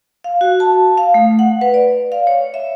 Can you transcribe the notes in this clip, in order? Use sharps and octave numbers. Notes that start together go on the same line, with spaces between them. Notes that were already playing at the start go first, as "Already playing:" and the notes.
F5
F#4
A5
F5
A3
F#5
B4
D5
F5
C#5
E5